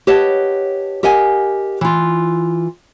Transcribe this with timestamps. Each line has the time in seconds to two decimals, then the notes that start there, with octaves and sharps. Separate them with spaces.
0.07 G4 B4 C#5 D#5 F#5 A5
1.03 G4 A#4 D#5 F#5 G#5
1.81 E3 F4